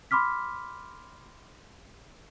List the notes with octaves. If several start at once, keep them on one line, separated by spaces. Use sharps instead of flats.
B5 C6 D6 F6 B6